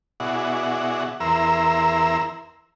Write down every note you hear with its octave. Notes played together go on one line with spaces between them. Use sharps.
B2 E4 F#4 G#4 D5 F#5
E2 E4 A#4 A#5 C6 E6